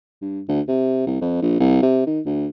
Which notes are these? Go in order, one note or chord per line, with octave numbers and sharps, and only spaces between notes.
G2
D2
C3
C2
F2
A#1
C2
C3
D#3
D2